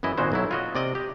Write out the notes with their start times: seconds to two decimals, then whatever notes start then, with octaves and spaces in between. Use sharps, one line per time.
0.03 F#2 E3 E4 D#5
0.18 G#1 A#2 G#3 F#4 C5
0.32 B1 F#3 E4
0.51 F4 F#4 D#5
0.75 C3 D5 D#5
0.95 G4